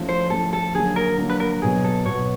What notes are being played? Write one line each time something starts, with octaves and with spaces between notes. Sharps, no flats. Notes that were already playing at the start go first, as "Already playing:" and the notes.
Already playing: F3 A3 C#4 E4
C5
F3 A3 C#4 E4 A4
A4
D3 F#3 A#3 G#4
A#4
D3 F#3 A#3
B4
A#4
B2 F#3 B3 G#4
A4
B2 F#3 B3 C#5